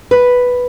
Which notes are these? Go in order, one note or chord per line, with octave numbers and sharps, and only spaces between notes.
B4